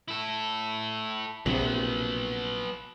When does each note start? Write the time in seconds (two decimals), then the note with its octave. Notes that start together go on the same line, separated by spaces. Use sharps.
0.08 E4 A4
1.46 A#1 C3 F#3 B3